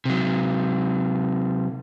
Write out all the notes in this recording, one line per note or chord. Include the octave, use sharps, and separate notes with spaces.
C3 F#3